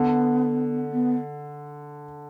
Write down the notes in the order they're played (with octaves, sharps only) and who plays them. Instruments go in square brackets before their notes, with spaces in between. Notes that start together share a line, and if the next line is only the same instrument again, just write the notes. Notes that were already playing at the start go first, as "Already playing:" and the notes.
Already playing: [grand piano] D3 [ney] B3
[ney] B3